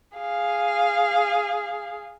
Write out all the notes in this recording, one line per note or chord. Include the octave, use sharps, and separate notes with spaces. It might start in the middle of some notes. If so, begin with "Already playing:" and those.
G#4 F5